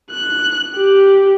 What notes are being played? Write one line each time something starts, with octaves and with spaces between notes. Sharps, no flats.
F#6
G4